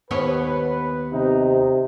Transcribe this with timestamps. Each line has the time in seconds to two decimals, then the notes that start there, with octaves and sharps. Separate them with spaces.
0.11 D#2 B3 B4 C#5
1.13 C3 D#4